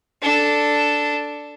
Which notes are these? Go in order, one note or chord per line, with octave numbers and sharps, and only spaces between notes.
D4 A4